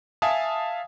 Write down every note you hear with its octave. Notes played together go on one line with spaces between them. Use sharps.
E5 F5 G#5 A5 D#6